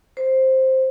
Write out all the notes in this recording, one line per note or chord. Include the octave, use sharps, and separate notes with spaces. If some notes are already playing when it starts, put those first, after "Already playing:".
C5